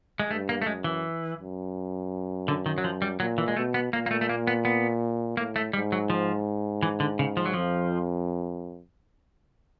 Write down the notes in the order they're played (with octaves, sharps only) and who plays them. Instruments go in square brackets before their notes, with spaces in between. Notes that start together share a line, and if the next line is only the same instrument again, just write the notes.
[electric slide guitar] G#3
[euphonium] G2 [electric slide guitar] A3
[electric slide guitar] A#3
A3
[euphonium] F#2 [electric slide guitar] G#3
[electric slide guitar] E3
[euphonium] F#2
[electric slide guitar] D3
D#3
F#3
F3
G3
[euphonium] A#2 [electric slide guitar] F#3
[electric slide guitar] E3
G#3
[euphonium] B2 [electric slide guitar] A3
[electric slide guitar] B3
[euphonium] A#2 [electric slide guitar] A#3
[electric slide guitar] A#3
A3
A3
A#3
B3
B3
[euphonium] A2 [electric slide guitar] A#3
[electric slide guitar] A3
[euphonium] G#2 [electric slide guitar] G3
[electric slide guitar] F#3
F3
E3
D3
C#3
F3
F#3
[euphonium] F2 [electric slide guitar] F3